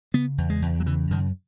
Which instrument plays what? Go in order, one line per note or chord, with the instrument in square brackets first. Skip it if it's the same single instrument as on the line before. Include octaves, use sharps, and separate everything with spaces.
[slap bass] C#3 B3
E2
G#3
E2
F#3
C#3 E3
F#2 D#3